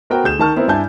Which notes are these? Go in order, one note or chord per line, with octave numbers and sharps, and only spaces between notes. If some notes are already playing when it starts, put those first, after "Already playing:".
B3 F#4 A#4 C5 G5
D2 G#4 G6 E7
D#3 A#4 A5 C#6 F6
B3 C4 E4 A#4 C5
G2 D4 E4 G#5 A5 G6